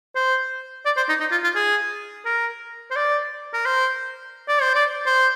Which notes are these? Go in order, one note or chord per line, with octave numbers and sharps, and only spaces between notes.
C5
D5
C5
D#4
D#4
F4
F4
G#4
A#4
C5
D5
A#4
C5
D5
C5
D5
C5